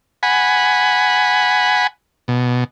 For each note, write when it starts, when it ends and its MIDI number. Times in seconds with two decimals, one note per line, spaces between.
0.23 1.87 78
0.23 1.87 80
0.23 1.87 83
2.28 2.64 47